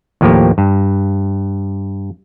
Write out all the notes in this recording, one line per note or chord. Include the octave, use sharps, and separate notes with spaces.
D#2 A2 F3 A#3 G4
G2